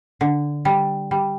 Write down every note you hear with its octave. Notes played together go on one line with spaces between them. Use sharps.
D3
G3
G3